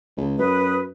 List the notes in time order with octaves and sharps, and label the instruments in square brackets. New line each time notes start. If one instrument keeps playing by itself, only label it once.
[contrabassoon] C#2
[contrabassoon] F#2 [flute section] B4 D#6